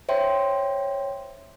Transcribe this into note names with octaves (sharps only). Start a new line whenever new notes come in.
C5 C#5 E5 G5 C6